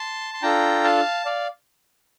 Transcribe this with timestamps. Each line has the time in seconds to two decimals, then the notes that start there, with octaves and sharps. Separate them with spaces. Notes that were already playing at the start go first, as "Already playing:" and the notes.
Already playing: A5 C6
0.34 C6
0.42 D4 F4 A4 G5 A#5
0.84 F5 A5
1.25 D5 F5